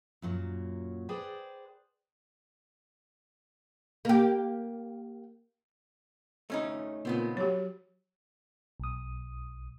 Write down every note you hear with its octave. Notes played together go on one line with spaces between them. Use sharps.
F#2 A#2 F#3
G#4 B4 C5 D5 G5
A#3 G4
A3 C#4 D#4
A#2 C#3 B3 C4
F#3 G4 C#5
B1 D#6